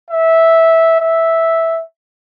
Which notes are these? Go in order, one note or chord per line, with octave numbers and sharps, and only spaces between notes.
E5
E5